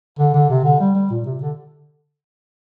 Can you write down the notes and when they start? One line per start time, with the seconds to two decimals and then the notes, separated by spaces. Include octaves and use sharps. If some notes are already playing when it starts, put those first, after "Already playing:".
0.19 D3
0.34 D3
0.49 C3
0.64 D3
0.80 G3
0.95 G3
1.10 A#2
1.25 C3
1.41 D3